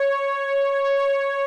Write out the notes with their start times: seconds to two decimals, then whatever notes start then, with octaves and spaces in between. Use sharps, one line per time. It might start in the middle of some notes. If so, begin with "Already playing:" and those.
Already playing: C#5
1.00 C#5